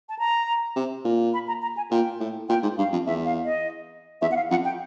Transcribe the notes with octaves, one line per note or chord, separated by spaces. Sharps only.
A5
A#5
C3
A#2
B5
A#5
A#5
G#5
A#2 G5
A2
A#2 G5
G#2
G2 F5
F2
E2 E5
F5
D#5
E2 E5
F#5
F5
F2 F#5
G5